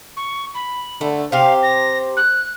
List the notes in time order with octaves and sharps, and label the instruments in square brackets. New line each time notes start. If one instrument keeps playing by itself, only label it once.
[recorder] C#6
B5
[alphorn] D3 [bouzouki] A3
[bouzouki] C3 G4 [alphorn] C5 [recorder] F5
[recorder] A#6
F#6